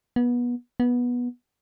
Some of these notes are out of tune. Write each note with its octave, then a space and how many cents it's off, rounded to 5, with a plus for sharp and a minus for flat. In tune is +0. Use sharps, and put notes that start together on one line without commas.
B3 -25
B3 -15